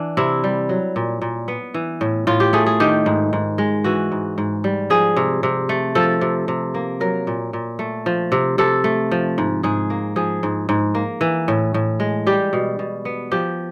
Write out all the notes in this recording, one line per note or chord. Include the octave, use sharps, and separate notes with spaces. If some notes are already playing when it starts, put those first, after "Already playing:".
Already playing: E3 D4
C3 E4
G3
F#3
A#2
A#2
B3
E3
A2
A2 F4
G4
A3 G#4
G#4
D#3 G4
G#2
G#2
G#3
E3 F#4
G#2
G#2
G3
F3 G#4
C3
C3
A3
F3 A4
C3
C3
A#3
F#3 A#4
A#2
A#2
A3
F3
C3
C3 A4
A3
F3
G#2
G#2 G#4
A#3
F3 G#4
G#2
G#2
A#3
E3
A2
A2
G#3
G3 G4
B2
B2
B3
F3 G4